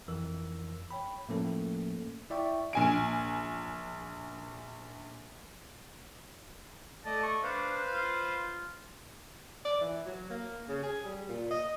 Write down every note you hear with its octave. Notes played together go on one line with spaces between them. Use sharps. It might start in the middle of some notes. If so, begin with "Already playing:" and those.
F2 E3 A#4 E6
C#5 G5 B5
A2 F3 A3 A#3 C#4 A4
E4 D5 E5 G5 C#6
A#1 G#5 D7
A3 D5 D#5 A5
C#6
D4 B4 C5 F5
F4
D5
E3
F#3
A#3
C#3
G#4
G3
A#2
D#5